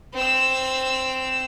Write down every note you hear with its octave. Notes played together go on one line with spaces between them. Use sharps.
C4 E6